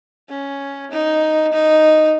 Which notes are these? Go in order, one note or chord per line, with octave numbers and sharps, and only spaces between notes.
C#4
D#4
D#4